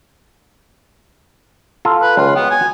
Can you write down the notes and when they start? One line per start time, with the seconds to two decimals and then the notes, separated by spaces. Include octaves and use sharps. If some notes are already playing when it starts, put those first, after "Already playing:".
1.85 F4 A4 A#5
2.02 B4
2.17 C#2 F4
2.36 B3 F#4 G5
2.51 G#5